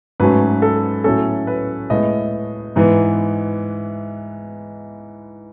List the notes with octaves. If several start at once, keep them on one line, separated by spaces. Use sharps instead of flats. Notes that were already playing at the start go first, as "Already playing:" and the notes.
G#2 F#3 A3 C#4 B4
A4
A2 F#3 C#4 A4
B4
A2 G#3 B3 D#5
G#2 E3 B3